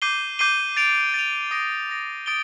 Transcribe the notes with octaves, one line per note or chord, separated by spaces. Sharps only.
D6 G6 C7 D#7 G7
D6 G6 C7 D#7 G7
A6 D7 F7
A6 D7 F7
D#6 A#6 D7
D#6 A#6 D7
D#6 A6 D7 G7